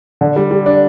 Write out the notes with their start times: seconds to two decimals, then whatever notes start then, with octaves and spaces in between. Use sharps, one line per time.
0.21 D3
0.36 G3
0.51 G3
0.66 D4